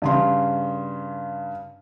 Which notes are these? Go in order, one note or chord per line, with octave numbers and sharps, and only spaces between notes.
G2 C#3 C6